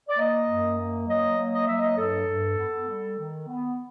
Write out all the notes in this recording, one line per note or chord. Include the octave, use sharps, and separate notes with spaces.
D5
A#3 D#5
F#2
A#3
F#3 D#5
A#3
D#5
F#3 E5
D#5
G2 A4
G2
B3
G3
D#3
B3